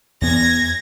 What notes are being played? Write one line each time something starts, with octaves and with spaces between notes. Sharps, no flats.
E2 B3 G#6 A#6